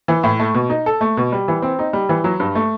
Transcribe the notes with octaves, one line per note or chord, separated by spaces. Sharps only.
E3
A2
A3
B2
D#4
A4
A3
B2
G3
E3
C4
D#4
G3
E3
F#3
G2
A3